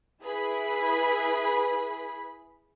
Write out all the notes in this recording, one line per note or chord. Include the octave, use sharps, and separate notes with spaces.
E4 G#4 B4 B5